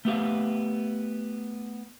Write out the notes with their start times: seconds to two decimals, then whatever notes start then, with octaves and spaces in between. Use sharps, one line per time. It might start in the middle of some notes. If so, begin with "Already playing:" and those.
0.05 A3 B3 G4 F5